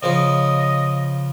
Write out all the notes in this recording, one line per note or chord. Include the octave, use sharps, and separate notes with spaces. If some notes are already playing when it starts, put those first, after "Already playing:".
C#3 F3 D#5